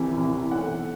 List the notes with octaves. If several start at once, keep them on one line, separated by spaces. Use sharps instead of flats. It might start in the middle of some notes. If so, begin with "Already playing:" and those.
Already playing: C2 C3 E3
C2 C3 E3
B1 B2 A3 F#5